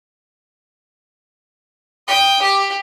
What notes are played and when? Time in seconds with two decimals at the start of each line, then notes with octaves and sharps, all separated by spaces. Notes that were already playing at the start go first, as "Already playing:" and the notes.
2.08 G5 D#6
2.42 G4